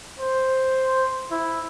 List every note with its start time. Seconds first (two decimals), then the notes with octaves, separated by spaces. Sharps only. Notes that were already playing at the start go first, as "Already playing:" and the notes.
0.20 C5
1.31 E4